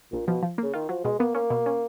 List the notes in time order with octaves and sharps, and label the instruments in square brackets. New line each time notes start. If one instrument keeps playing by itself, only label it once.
[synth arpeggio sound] A#1 [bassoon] A#2
[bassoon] B2 [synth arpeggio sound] F3
[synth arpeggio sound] F3
[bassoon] C#3 [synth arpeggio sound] A#3
[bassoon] D#3 [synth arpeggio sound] F4
[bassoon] F3 [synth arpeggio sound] F#3
[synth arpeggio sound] B2 [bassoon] G#3
[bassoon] A#3 [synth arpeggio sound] B3
[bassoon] A#3 [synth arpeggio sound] C#4
[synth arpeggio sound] B2
C#4